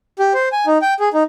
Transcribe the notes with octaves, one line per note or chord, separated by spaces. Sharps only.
G4
C5
G#5
D#4
G5
G#4
D#4